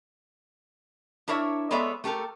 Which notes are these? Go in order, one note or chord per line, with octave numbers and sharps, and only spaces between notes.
D4 E4 A#4 C#5 E5
G#3 B3 A4 C#5 D5 E5
A3 G4 A4 A#4